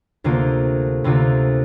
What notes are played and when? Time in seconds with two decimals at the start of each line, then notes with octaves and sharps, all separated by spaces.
0.24 D2 C3 A#3 F4
1.04 D2 C3 A#3 F4